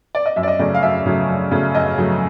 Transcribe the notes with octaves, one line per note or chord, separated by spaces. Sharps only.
D5
D#5
F#2 E5
D5
D#5
C#3 F#3 A3 D5
F5
F#2 E5
C#3 F#3 A3
F#2
C#3 F#3 A3
F#2 D#5
C#3 F#3 A3